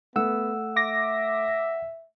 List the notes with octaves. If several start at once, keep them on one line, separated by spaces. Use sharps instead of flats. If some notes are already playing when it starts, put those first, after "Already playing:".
A3 B3 F#5 E6
E5 D6 A#6